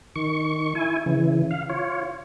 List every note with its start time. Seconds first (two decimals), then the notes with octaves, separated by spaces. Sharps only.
0.16 D#3 C#6
0.75 E4 G#5
1.06 C#3 E3
1.51 F5
1.69 F4 C#5